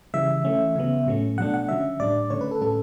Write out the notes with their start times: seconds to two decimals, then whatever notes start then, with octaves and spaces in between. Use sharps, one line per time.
0.14 C#3 E3 G3 E5
0.45 E3 A3 C#4
0.76 C#3 F#3 B3
1.07 A2 F#3 A3 C#4
1.38 B2 F#3 A3 D4 F#5
1.54 F#5
1.69 D3 F#3 C#4 E5
2.00 A2 G3 D4 D5
2.30 D3 A3 C#4 C#5
2.41 B4
2.51 A4
2.62 A2 G3 C#4 A4